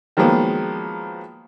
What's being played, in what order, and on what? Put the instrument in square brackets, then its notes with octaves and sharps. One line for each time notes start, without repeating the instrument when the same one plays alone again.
[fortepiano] D#3 F3 F#3 G#3 A#3 B3